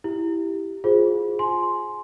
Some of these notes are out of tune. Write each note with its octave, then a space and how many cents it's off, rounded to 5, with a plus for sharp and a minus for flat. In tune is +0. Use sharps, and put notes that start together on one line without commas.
E4 +0 G4 +0
F4 +15 G#4 +0 C5 +0
G#5 +25 C6 +0